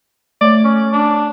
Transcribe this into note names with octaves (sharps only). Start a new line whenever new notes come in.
A3 C#5 D5
C#4
D4